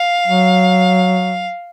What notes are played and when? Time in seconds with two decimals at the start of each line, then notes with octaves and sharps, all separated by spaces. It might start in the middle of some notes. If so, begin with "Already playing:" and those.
Already playing: F5
0.27 F#3